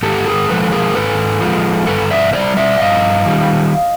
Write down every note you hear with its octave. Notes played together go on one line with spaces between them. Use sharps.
G#2 G4 A4
G#4 A#4
F3 G#3 A4 B4
G#4 A#4
G#2 A4 B4
F3 G#3
G2 A4 B4
D5 E5
D#3 G3 C5 D5
D5 E5
G2 D#5 F5
D#3 G3